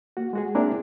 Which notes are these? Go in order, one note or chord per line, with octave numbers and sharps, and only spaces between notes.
A#3 F#4
G#3 F#4 G#4
A#3 C4 D4 E4 G#4 A#4